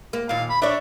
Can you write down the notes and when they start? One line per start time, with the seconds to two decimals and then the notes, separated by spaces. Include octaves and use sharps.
0.13 A#3
0.29 D#2 A#2 F5
0.50 B5
0.62 D4 C#5 E5